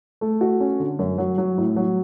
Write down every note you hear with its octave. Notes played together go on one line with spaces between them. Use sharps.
A3
F#4
C#4
D3
F#2
F#3
F#3
A2
F#3